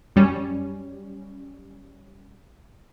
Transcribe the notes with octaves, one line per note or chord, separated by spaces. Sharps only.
F#2 G3 C#4